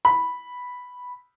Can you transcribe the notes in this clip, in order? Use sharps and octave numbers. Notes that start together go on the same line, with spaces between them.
B5